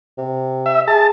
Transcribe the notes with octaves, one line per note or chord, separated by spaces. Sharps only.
C3
E5
G#4 A5